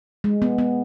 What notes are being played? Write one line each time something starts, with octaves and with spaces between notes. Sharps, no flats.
G#3
B3
B3